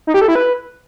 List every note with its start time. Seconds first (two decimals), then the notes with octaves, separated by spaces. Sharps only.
0.07 D#4
0.14 G4
0.21 A4
0.28 E4
0.35 B4